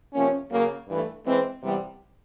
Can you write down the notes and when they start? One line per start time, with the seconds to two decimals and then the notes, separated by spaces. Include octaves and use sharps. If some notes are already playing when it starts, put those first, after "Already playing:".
0.14 C3 F3 A#3 C#4
0.51 C#3 F#3 A#3
0.87 G2 E3 A3
1.25 E3 G#3 C4
1.62 C3 E3 G3 B3